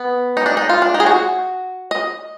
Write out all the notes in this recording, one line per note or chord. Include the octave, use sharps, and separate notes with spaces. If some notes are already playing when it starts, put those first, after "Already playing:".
Already playing: B3
D#4
D4
D#4
F4
D4
D#4
G#4
F#4
D#5